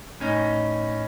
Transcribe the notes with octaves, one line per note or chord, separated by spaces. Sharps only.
A2 C#4 D#4